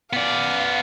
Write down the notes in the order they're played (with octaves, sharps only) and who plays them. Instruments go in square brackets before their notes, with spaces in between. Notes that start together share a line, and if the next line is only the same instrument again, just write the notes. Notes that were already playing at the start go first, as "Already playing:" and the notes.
[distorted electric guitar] B3 D5 [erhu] F5